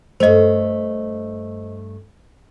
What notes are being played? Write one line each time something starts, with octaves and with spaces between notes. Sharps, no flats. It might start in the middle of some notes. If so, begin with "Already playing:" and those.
G2 A3 C5 D#5